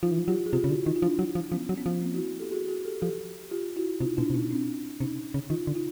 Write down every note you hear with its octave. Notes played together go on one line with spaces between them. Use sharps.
F3 D#4 F4
E3
F3
F#3 F4 G4
G#4
C3 F4 G4
C#3
D3 E4 F#4
D#3 D#4 F4
F4
F3 D4 E4
F#3
F3
F3 B3 C#4
F#3
B3 C#4
F3
A#3 C4
E4 F#4
G4 A4
F#4 G#4
F#4 G#4
G4 A4
F3 G4 A4
F4 G4
E4 F#4
C3 D#4 F4
B2 D4 E4
C3
B2 C#4 D#4
C4 D4
C3 C#4 D#4
C#3
D#3 D#4 F4
D3
D#4 F4